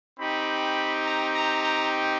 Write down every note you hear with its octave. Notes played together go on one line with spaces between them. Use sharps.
C4 D#4 G4 B5
A#5
A#5
A#5